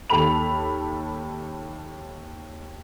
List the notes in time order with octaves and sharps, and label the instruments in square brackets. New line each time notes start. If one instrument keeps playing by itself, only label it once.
[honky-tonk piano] D#2 A4 B5 F7